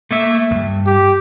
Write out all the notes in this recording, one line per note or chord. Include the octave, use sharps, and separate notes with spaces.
A3 A#3 E5
E2 G2
G4